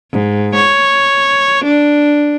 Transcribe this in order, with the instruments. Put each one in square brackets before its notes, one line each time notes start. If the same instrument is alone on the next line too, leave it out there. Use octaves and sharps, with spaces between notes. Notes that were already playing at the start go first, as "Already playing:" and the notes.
[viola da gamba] G#2
C#5
D4